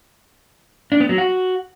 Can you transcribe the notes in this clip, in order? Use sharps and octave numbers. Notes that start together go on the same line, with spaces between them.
D4
B3
F#3
F#4